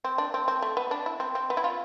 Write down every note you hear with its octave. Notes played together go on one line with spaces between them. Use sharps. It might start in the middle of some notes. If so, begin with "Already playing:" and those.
C4
D4
C4
C4
A3
B3
D4
E4
C4
C4
B3
E4
F4